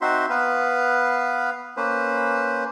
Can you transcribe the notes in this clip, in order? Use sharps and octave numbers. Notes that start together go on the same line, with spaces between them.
C4 D#4 F#4 C5 E5 C6
B3 B4 F5
A#3 C#4 B4 C5